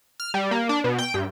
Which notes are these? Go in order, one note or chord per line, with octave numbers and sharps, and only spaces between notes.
F6
G3
A#3
D4
B2
G5
G2